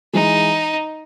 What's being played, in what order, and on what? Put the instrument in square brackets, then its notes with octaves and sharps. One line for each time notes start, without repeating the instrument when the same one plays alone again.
[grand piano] E3 G#3 [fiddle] D#4